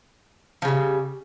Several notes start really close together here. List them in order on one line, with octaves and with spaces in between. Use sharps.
F3 C#3 G3